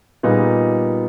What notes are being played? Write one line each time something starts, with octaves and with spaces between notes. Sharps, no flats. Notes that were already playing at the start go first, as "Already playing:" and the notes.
A#2 G3 B3 D#4 G#4